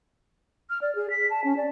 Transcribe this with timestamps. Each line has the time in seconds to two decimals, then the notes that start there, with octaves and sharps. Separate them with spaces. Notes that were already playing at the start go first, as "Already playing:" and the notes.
0.70 F6
0.82 D5
0.95 G#4
1.10 B6
1.30 A5
1.44 C#4
1.57 D5